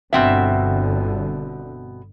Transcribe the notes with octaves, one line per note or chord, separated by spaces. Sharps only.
G1 B2 D3 C4 E5